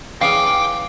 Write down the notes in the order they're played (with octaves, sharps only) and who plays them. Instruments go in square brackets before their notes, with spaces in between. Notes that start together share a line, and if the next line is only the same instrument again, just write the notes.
[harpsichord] E3 C#4 G#4 [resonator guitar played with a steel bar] F5 [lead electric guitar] G5 [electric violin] D6